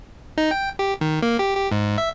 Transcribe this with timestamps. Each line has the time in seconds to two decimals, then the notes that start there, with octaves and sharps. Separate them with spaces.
0.38 D#4
0.51 G5
0.79 G4
1.01 D#3
1.22 A#3
1.39 G4
1.56 G4
1.72 G#2
1.98 E5